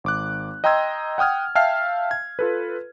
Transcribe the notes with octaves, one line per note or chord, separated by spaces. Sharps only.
G#1 D6 F#6
D#5 G5 A#5 C6 E6 G#6
F#5 G5 D#6 F6 G#6
E5 F5 G5 A5 F6 C7
G#6
F4 A4 B4